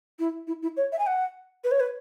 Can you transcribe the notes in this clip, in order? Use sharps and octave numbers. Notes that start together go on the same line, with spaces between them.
E4
E4
E4
C#5
E5
G#5
F#5
B4
C#5
B4